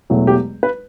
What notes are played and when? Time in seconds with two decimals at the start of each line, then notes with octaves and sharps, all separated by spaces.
0.10 E1 E2 B2 F#3 A3
0.27 G4
0.63 B4